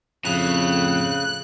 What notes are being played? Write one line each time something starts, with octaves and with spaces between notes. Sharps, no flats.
F2 A2 C#3 F#6